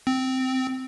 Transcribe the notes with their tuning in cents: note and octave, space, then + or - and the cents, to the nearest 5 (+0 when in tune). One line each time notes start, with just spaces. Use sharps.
C4 -10